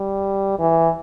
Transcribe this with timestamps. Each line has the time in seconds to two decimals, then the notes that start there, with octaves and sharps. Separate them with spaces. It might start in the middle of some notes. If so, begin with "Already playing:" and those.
Already playing: G3
0.59 E3